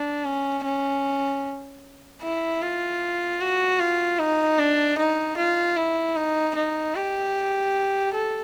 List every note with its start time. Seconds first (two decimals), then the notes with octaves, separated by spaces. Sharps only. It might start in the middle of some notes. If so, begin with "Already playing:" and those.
Already playing: D4
0.25 C#4
0.65 C#4
2.22 E4
2.62 F4
3.41 F#4
3.80 F4
4.19 D#4
4.59 D4
4.99 D#4
5.37 F4
5.77 E4
6.16 D#4
6.56 D#4
6.95 G4
8.13 A4